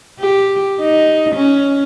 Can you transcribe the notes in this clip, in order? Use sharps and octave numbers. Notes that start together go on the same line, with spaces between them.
G4
D#4
C#4